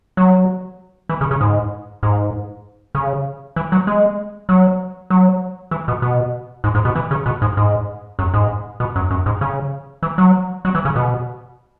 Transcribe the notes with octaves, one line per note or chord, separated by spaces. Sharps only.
F#3
E3
C#3
C#3
G#2
G#2
C#3
E3
F#3
G#3
F#3
F#3
E3
B2
B2
G#2
G#2
B2
E3
C#3
B2
G#2
G#2
F#2
G#2
B2
F#2
F#2
G#2
C#3
E3
F#3
F#3
E3
C#3
B2